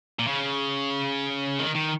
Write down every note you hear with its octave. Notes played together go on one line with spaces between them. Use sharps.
A#2
C#3
D#3
D#3